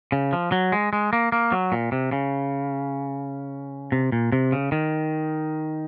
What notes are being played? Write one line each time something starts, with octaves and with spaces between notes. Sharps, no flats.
C#3
F3
F#3
G#3
G#3
A#3
A#3
F#3
A#2
C3
C#3
C3
A#2
C3
C#3
D#3